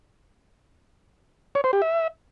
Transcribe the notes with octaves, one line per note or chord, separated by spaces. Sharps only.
C#5
C5
G4
E5